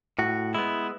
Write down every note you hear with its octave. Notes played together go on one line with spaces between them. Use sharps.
A2 F#4
G#3 B3 E4